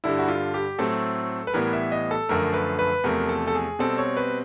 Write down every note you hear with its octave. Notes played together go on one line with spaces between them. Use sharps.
G2 D3 G3 E4
F#4
F4
G4
A2 F#3 A3 C4 A4
B4
A2 E3 G3 B3 A#4
E5
D#5
A4
F#2 D3 F3 A3 A#4
B4
B4
E2 C3 F3 A3 A#4
A4
A4
G#4
B2 G3 C4 A4
C#5
B4